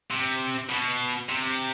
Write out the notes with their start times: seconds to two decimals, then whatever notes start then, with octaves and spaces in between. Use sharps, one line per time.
0.11 C3
0.70 B2
1.29 C3